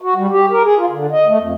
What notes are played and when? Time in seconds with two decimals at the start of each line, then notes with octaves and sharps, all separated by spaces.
0.01 F#4
0.16 G3
0.29 G4
0.51 A#4
0.64 G#4
0.78 F4
0.90 D3
1.12 D#5
1.27 A3
1.39 F2